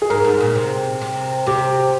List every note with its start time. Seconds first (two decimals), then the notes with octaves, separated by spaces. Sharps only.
0.02 G#4
0.10 G#2 A#4
0.24 G#2
0.40 A#2
0.55 C3
1.01 C3
1.47 C3 G4